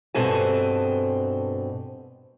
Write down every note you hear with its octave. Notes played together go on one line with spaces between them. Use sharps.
G2 B2 C4 A4 G#5